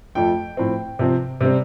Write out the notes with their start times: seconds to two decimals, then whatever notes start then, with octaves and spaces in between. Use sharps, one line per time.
0.15 F2 F3 A3 G5
0.57 A2 F3 C4
0.99 C3 F3 C4
1.41 C3 G3 C4